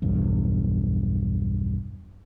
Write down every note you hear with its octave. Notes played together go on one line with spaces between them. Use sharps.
B1 E2 G2